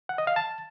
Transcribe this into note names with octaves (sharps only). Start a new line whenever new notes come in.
F#5
D#5
F5
A5